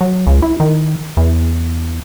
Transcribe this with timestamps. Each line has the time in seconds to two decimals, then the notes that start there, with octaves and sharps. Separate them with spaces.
0.01 F#3
0.27 C#2
0.42 E4
0.60 D#3
1.17 E2